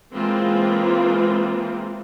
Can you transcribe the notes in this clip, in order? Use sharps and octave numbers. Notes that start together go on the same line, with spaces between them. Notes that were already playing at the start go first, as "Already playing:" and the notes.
E3 G#3 A#3 C4 F4